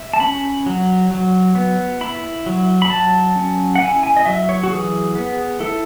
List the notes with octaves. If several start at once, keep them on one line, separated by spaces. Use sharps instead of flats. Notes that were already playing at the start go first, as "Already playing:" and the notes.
Already playing: E5
A5
C#4 B5
F#3
F#3
B3
E4 B5
F#3
B5
F#3 A5
C#4
F#5
E4 G#5
G#5
D#5
F#3 E5
C#5
F#4
E3 G#4
B3
E4 A4